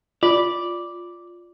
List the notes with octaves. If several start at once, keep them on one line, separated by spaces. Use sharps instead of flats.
F4 D5